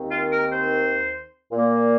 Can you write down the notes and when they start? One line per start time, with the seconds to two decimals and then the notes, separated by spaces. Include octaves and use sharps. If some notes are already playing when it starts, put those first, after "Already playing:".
Already playing: D#2 D#3 C4
0.09 F4
0.30 A#4
0.51 C5
1.52 A#2 A#3